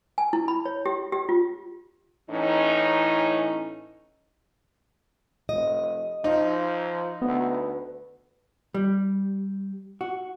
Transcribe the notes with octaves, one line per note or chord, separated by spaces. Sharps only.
G#5
E4
B5
C#5
G4
G4
F4
A2 E3 C#4 D#4
F1 D#5
F3 D#4
D2 B3
G3
F#4